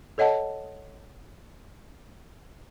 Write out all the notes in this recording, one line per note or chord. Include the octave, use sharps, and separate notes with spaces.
A4 C#5 D#5 F#5 A5